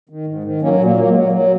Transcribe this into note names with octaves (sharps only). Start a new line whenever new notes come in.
D#3
G#2
D#3
F#3 A#3 C#4
A#2
A#3
F#3 A#3
G#3
F#3
F#3 A#3